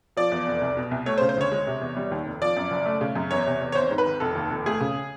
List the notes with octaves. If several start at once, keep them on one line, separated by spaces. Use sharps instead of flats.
F3 D5
E2
F1
C2
B2
C2
A3 C#5
C5
C#3
C5
D2 C#5
G#3
C3
E2
G3
D#2
F1
F3 D5
F#2
F#1
A3
C#3
F#2
E2 C#5
C3
E2
C#5
G#1 C5
G#2
B4
G#1
F1 A4
D#2
F1
A3 G#4
C#3